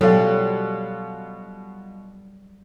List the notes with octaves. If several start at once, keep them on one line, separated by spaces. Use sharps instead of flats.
B2 F#3 G3 F4 A4